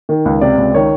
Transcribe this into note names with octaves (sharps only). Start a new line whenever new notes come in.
D#3
C#2
C3 D5
C#2
D#3 C#5